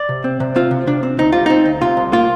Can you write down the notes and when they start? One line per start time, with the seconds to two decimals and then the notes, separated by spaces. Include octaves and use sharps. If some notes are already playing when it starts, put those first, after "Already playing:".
Already playing: D5
0.09 C3
0.24 C4
0.40 C3
0.56 C4 F4
0.71 C3
0.87 C3 D4
1.03 C4
1.18 D2 D#4
1.32 G3 F4
1.46 C4 D#4
1.65 D2
1.81 C3 F4
1.97 C2
2.12 A#3 F4